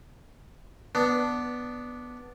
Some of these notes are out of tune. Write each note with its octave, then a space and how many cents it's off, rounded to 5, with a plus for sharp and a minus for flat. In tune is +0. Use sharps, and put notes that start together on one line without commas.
B3 +0 D4 +0